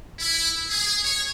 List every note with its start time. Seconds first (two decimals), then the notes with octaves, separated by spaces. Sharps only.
0.20 E4
0.70 G#4
1.02 C#5